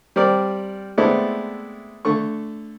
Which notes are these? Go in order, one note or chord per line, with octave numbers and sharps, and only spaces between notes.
G3 C4 A#4 D5
G#3 A3 B3 C4 D4 E4
D3 A3 C#6